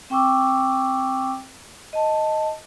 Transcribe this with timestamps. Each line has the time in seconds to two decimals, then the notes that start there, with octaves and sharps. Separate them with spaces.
0.10 C4 G5 C#6 D6 E6
1.93 D#5 A5